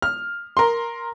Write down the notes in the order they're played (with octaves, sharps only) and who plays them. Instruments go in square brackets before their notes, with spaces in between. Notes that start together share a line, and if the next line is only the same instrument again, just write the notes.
[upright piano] F6
A#4 C6